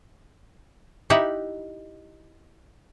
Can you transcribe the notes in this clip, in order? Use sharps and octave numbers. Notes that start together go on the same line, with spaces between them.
D#4 E4 G4 E5 F#5